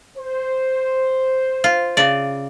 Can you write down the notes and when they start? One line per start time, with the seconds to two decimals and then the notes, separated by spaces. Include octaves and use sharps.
0.18 C5
1.64 F4
1.97 C#3 D5